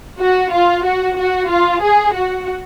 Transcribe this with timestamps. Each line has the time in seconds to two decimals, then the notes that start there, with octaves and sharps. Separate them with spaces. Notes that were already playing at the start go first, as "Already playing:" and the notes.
0.20 F#4
0.52 F4
0.85 F#4
1.17 F#4
1.49 F4
1.82 G#4
2.14 F#4